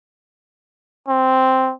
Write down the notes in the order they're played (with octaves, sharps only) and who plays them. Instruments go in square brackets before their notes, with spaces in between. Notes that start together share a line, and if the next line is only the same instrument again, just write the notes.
[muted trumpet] C4